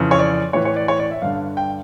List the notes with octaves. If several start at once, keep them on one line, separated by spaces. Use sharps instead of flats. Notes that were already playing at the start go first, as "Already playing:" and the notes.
Already playing: F2 C#3 E3
C#5
D5
A2 E3 C#5
C#5
D5
C#5
D5
E5
G2 D3 F5
G5